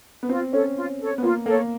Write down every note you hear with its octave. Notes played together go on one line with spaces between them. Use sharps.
B3
C4 F4
C#4 A4 C#5
F4
A4 C#5
B3
A#3 F4
A#3 A4 C#5